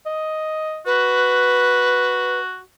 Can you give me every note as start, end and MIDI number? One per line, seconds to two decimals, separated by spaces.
0.06 0.81 75
0.86 2.60 66
0.86 2.40 71